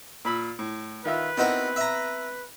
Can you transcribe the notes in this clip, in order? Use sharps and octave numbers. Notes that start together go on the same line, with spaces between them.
A#2 B5 E6
A2
D#3 F4 B4 E5
B3 C4 D#4 E4 F#4 A#4
E5 A#5